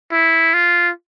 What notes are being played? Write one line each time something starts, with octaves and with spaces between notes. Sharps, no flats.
E4
F4